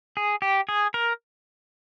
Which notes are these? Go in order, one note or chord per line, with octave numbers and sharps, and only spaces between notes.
G#4
G4
G#4
A#4